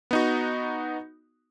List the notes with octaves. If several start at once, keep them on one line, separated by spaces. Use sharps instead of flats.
B3 D#4 F#4